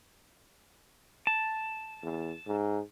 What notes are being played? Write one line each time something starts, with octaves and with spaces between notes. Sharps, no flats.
A5
E2
G#2